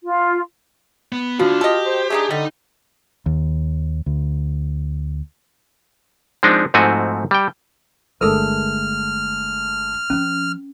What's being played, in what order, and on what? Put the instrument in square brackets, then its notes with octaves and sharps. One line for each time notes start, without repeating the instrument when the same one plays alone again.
[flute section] F4
[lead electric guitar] B3
[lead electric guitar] D2 D4 [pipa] F3 [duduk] F4 [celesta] F#4
[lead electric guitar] G4 [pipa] A4 D#5
[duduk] C5
[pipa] A3 D4 D#4 [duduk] G#4
[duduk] D3 [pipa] G3 [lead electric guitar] D#4 D#5
[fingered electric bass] D#2
D2
[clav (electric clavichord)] F3 G#3 C4 D4 D#4
G#2 F3 A3 C4 F#4 G#5
G3 G5
[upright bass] G1 [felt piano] D3 G#3 A3 [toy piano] A4 A#4 [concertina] F6
[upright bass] F3 C4 [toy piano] C#4